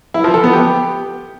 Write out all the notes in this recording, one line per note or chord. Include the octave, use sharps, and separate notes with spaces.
E4
F3
A4
B3
G4